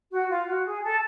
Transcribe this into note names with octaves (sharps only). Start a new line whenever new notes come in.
F#4
F4
F#4
G#4
A4